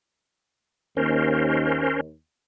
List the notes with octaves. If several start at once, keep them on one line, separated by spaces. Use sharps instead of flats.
D#2 C#4 A#4 C5